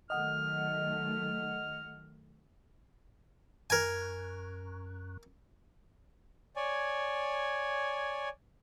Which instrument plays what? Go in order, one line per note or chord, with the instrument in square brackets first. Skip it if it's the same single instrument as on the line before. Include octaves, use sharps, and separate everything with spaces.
[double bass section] D#3 F#3 A3 [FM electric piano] D#5 F#5 [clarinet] F6
[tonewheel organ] F#2 [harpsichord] A#4 G#5
[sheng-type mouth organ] C#5 D5 G#5